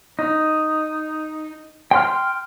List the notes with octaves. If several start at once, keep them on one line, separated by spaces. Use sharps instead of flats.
D#4
G5 C6 F6